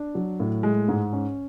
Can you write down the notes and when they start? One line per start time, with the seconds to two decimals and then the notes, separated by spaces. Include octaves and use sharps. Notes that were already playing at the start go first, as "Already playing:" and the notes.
Already playing: D4
0.15 F#3
0.40 A2
0.63 G#3
0.88 G#2
1.13 C#4